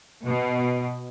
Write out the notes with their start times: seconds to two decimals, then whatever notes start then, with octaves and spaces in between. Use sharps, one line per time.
0.24 B2